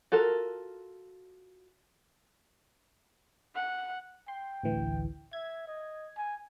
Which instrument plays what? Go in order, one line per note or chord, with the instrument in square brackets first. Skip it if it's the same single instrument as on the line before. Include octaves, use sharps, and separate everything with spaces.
[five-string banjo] F4 F#4 A4 A#4
[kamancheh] F#5
[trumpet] G5 [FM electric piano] C6
[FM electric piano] A1 D2 E3
[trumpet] E5 [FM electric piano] G#6
[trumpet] D#5
G#5